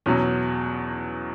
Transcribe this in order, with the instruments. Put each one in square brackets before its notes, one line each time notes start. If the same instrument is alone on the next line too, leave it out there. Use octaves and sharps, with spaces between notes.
[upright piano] E2 B2 F#3 C#4